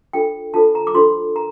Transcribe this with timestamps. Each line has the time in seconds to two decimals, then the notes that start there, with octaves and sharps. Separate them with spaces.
0.13 D4 F4 A4 C5 G5
0.54 D4 F4 A4 C5 A5
0.75 A#5
0.87 D6
0.95 D4 F4 A4 C5 C6
1.36 A#4 A#5